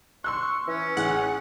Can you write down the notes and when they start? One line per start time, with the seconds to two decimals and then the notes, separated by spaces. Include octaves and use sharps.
0.24 C6 C#6 E6 F#6
0.68 E3 C#4
0.97 A1 G#4 F#5